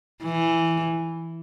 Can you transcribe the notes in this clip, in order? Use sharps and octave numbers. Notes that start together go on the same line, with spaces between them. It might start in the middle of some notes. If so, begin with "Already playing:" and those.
E3